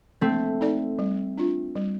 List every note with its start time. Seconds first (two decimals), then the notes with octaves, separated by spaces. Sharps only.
0.21 A3 A#3 C4
0.61 D#4 A4 D5
0.99 G3
1.38 D4 F4
1.76 G3